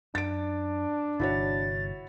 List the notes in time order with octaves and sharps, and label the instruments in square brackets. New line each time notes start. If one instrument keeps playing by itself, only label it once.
[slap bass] F#2 [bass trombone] D4 [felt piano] A6 D7
[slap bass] G1 C3 [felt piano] E4 F#4 C#5 [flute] A6